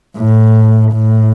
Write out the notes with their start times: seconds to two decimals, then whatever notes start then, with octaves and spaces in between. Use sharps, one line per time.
0.17 A2
0.92 A2